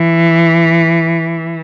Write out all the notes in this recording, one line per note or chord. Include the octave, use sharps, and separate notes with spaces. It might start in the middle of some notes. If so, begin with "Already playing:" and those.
Already playing: E3